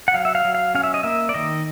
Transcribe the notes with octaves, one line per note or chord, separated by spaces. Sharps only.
F#5
F#3 F5
E5
F5
F#3
F5
C#4 F5
E5
D#5
A#3 E5
D5
D#3 D#5